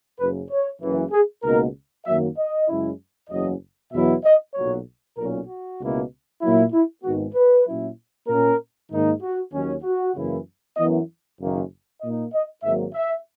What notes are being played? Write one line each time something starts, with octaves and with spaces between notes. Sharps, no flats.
F#1 F#2 C#3 B4
C#5
F#1 F#2 C#3 E3
G#4
C#2 B2 A#3 D#4 A#4
F#2 D#3 F#3 A#3 E5
D#5
F#2 C#3 G#3 C#4 E4
F#1 E2 C#3 F#3 D#5
E2 B2 F#3 B3 E4 E5
D#5
B1 A#2 F#3 C#5
B1 A#2 F#3 C#4 A#4
F#4
C#2 B2 A#3 E4
A#2 F#3 A#3 E4
E4
G#1 G#2 D#3 G#3 B3 F#4
B4
A#2 F#3 C#4 E4
A#2 A#3 C#4 A#4
G#2 D#3 A#3 D#4
F#4
D#2 D#3 F#3 C#4
F#4
F#2 C#3 E3 A#3 E4
F#2 E3 B3 E4 D#5
F#1 F#2 D#3 A#3
A#2 A#3 D#4 D#5
D#5
G#1 G#2 F#3 A#3 E5
E5